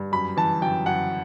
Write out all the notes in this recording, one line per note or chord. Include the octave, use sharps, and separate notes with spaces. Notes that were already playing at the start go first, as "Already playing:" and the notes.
Already playing: G2
F#2 B5
E3 A5
F#2 G5
F#2 F#5